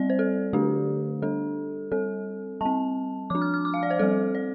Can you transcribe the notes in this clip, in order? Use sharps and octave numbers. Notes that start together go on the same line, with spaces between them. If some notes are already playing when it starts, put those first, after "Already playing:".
Already playing: G3 C4 D5
C5
A4
D3 A3 D4 G4
G3 D4 A4
G3 C4 A4
G3 C4 A5
F3 D4 D6
F6
F6
D6
F5
D5
C5
G3 C4 A4
D5